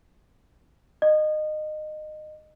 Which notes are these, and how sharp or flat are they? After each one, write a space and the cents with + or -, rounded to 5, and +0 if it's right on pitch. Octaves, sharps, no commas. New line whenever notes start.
D#5 -25